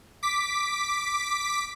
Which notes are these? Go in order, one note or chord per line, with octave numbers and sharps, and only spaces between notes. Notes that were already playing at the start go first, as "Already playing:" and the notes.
D6 B6